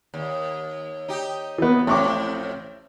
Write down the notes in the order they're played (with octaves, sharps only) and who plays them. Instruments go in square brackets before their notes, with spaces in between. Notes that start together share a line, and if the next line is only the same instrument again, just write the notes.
[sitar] D#2
D#4 G4
[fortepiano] E3 B3
[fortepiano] A1 C#6 D6 [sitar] F2 A2